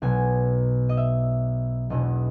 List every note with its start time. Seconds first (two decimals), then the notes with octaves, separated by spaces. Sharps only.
0.02 B1 B2 F#3 G#5
0.89 D#5
0.97 E5
1.90 E1 E2 B2 F#3 D#5